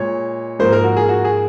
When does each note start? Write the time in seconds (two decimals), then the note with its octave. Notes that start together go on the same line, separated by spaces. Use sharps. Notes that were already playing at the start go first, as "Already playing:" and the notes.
Already playing: A#2 G#3 C#5
0.59 G#2 F3 A#3 C5
0.73 A#4
0.84 F#4
0.97 G#4
1.09 F#4
1.25 G#4